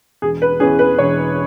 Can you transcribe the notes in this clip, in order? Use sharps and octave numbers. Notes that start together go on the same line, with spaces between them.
E1 G#4
B4
E2 E3 C#4 G#4
B4
E1 C#5